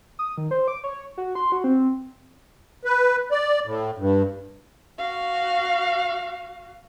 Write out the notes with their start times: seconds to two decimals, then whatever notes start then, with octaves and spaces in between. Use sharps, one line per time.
0.19 D#6
0.37 D#3
0.51 C5
0.68 D6
0.84 C#5
1.18 F#4
1.35 C6
1.52 F#4
1.64 C4
2.85 B4
3.31 D5
3.66 A2
3.98 G2
4.98 F#4 F5